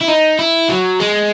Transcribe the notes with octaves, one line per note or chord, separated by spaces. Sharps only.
E4
D#4
E4
F#3
G#3